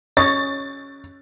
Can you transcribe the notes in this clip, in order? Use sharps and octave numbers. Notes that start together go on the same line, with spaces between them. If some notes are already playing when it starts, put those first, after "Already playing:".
C#4 C#5 D#5 A6